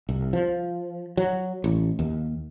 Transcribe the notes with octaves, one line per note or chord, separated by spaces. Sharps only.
C2
F3
F#3
A1
D#2